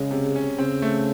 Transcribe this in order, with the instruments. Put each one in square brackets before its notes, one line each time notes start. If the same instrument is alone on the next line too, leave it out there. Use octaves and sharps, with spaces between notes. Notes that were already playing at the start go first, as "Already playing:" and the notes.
Already playing: [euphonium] C#3 [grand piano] G#3
[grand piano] C3
C#4
[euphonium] C#3 [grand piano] C4
[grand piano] A3